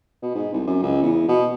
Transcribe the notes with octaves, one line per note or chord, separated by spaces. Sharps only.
B2
G#2
C2
F#2
C#2
E2
B2